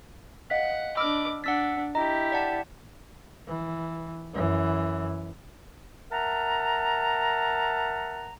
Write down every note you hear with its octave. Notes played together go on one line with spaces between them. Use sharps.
D#5 F5 F#5 B6
D4 D#5 B5 D6 E6 F6
D4 F#5 E6 A6 B6
E4 G4 D#5 A#5
D5 F#5 A5
E3
F#2 E3
A#4 E5 F#5 A5 A#5